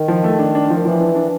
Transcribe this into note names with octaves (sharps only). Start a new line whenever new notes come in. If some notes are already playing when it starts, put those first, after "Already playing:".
Already playing: D#3
F3
A3
D4
D4
F3
E3 F3
D4
D4